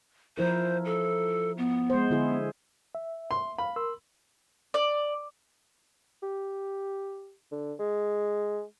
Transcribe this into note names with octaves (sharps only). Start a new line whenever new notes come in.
F3 E4 A#4 C5
A4
B3
G#3 C5
D3 E4 G#4
E5
C6
F5 B5
A#4 C6 E6
D5
G4
D3
G#3